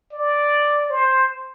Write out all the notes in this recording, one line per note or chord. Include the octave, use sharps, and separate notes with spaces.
D5
C5